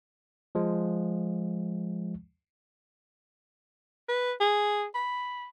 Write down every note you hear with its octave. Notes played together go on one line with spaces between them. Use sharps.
F3 G#3
B4
G#4
B5